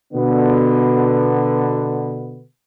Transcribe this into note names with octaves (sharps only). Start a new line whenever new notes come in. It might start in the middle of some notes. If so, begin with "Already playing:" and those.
B2 D3 B3